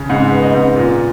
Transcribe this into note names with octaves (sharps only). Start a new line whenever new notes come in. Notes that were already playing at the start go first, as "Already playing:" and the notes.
Already playing: C#3
G#2 F#5
B3
D#5
G#2
A#2